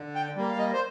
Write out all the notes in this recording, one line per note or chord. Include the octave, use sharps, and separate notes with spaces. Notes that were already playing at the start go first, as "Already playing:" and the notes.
Already playing: D3
G5
G3 A#3
F5
D#5
C5